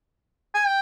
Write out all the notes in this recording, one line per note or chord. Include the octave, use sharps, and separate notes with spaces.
G#5
G5